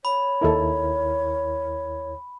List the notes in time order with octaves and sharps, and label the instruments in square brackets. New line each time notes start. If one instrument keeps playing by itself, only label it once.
[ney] C#5 [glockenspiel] B5
[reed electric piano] D#2 E4 A#4 [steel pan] D#4 A4